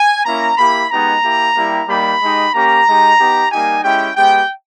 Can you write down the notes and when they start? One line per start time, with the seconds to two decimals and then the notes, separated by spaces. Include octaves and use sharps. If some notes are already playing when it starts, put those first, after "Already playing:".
Already playing: G#5
0.25 A#3 C#4 E4 A#5
0.58 A#3 E4 G4 B5
0.91 G#3 B3 D#4 G4 A#5
1.23 A#3 E4 G4
1.56 G3 A#3 E4 G4
1.88 G3 A#3 D#4 G4 B5
2.21 G#3 D#4 G4
2.53 A#3 C#4 G4 A#5
2.86 G#3 D#4 G4
3.19 B3 D#4 G4
3.52 G3 A#3 D#4 G4 G#5
3.84 G#3 C#4 E4 G4 G5
4.16 G#3 B3 G4 G5